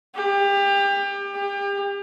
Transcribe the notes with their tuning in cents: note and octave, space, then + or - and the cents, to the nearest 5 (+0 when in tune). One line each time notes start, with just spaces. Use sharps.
G4 +30
G4 +35